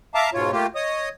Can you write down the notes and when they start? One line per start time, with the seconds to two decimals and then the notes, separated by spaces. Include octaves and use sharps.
0.15 E5 F5 A5 A#5 D6
0.34 G#2 B2 F4 C#5
0.52 A3 A#3 F4 G4
0.75 C#5 D#5 D#6